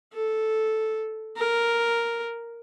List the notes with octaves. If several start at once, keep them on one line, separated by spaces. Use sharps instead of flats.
A4
A#4